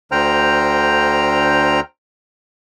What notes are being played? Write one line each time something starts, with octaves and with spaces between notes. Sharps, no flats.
D2 D3 C5 G5 A#5 F6